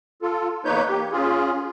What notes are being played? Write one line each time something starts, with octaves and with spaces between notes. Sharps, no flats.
F4 A4
E2 A#3 D#4 B4 C#5 G6
A#3 G4
C#4 F4 G#4